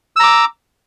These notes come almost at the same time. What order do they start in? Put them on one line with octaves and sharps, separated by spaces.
E6 A#5 D6